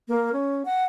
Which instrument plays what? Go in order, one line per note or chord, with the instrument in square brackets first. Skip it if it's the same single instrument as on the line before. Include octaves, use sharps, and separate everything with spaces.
[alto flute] A#3
C#4
F#5